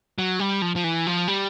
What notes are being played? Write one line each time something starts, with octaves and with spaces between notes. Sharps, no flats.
F#3
G3
F3
F3
E3
F3
G3